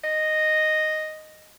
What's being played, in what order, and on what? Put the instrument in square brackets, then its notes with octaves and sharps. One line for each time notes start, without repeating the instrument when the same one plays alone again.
[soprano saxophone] D#5